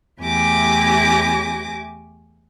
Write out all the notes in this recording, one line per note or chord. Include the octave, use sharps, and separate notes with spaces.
E2 A3 G4 G#5 D6 A#6